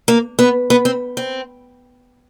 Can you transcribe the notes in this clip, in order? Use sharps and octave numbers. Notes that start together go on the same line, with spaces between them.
A#3
B3
B3
C4
C4